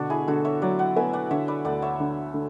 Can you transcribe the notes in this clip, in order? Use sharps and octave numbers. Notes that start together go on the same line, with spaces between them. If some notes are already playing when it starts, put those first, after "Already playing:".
Already playing: B2 D3 D4 F#4
E4 G#4
D3 F#4 A4
C#5 E5
F#3 D5 F#5
D5 F#5
B3 E5 G#5
D5 F#5
D3 C#5 E5
B4 D5
D2 D5 F#5
C#5 E5
D3
D3